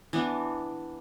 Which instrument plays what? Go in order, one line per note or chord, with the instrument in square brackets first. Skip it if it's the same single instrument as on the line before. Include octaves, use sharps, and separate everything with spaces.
[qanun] E3 B3 D4